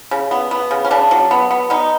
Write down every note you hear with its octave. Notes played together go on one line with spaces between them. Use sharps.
C#3
B3
B3
C#3
C#4
C#3 D4
F#3
B3
B3
B3 D#4